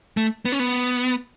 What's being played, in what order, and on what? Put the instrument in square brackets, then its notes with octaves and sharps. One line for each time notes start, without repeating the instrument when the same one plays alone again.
[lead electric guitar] A3
B3
C#4
B3